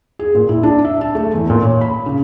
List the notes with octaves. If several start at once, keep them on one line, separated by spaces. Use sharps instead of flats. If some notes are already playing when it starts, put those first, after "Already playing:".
G#4
A#2
E4
D4
E5
A5
A3
E2
A#2
C#5
B5
C#3